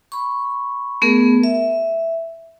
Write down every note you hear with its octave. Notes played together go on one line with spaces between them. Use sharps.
B5 C#6
A3 B3 G#4 A#4
E5